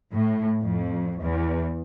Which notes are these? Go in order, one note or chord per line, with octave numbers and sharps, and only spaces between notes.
A2
F2
E2